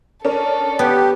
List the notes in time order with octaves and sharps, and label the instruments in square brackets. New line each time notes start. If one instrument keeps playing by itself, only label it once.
[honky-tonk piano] C#4 D4 A#4 [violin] A4
[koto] B3 [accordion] G4